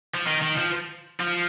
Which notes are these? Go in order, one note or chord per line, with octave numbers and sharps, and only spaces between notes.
F3
D#3
D#3
F3
F3